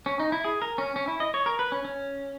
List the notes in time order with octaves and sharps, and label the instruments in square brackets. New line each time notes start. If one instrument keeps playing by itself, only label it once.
[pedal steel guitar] C#4
D#4
E4
G#4
A#4
C#4
C#4
E4
D#5
C#5
A#4
B4
C#4
C#4